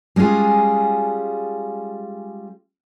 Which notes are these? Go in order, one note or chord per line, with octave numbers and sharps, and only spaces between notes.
G3 G#3 C#4 F4 G#4